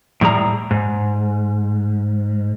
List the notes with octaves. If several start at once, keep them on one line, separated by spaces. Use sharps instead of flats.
A2 G3 G#4 A#5
G#2